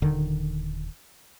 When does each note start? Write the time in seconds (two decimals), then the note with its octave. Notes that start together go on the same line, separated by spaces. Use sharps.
0.02 D#1 D3 D#3